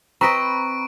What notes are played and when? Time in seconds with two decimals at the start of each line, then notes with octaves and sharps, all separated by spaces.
0.21 C4 B4 D#5 A#5 B5 C#6 D7